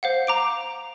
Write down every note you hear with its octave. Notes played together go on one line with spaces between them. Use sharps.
C5 F5 F#5
A#5 D6 D7